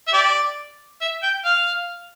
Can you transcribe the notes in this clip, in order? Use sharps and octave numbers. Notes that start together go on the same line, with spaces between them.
E5
G4 D5
E5
G5
F5